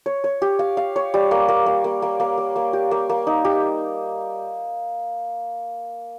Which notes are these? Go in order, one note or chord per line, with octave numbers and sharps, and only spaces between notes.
C#5
C#5
G4
F5
F5
C#5
G3
A#3
A#3
A#3
A#3
A#3
A#3
A#3
A#3
G4
A#3
A#3
D#4
G4